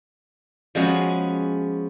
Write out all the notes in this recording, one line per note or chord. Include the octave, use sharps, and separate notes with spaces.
F3 G#3 B3 C#4 F#4 G#4